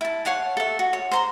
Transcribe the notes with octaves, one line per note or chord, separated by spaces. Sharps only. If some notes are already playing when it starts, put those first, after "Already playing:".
E4 A5
C#5 F5 F#5 A5
A4 E5
F#4
C#5
C5 A#5 C6